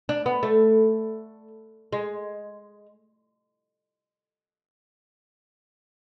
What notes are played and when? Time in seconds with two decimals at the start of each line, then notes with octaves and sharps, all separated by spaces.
0.09 D4
0.26 B3
0.43 A3
1.93 G#3